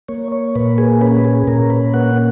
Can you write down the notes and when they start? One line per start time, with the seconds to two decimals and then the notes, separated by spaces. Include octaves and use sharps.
0.08 A#3 C#5
0.32 C#5
0.55 A#2 B4
0.78 G#4
1.01 C#4 B4
1.24 G#4
1.47 A#2 A#4
1.70 B4
1.94 A#3 F#5